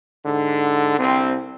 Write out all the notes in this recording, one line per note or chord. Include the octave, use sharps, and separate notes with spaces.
G#2 D3
C2 C4